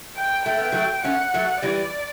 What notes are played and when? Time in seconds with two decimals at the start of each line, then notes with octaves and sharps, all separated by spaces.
0.17 G5
0.46 A3 G5
0.59 B3
0.72 F#3 A3
1.04 A3 C#4 F#5
1.34 F#3 A3
1.62 E3 G3 D5